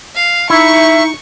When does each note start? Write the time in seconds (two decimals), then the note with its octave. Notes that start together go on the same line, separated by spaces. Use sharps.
0.15 F5
0.50 D#4 E4 E5 C#6